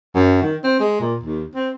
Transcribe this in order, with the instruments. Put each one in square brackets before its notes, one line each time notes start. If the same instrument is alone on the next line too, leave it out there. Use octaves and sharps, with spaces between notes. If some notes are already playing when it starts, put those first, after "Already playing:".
[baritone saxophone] F#2
D#3
C4
G#3
A#2
D#2
C4